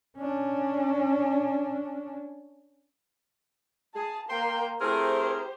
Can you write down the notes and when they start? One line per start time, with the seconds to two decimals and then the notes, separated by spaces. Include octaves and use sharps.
0.18 C#4 D4
3.95 G#4 A5
4.29 A#3 G5 C6
4.81 A3 C4 E4 G4 G#4 A#4 C5